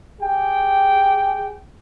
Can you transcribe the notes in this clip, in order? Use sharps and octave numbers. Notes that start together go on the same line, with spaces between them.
G4 G#4 G5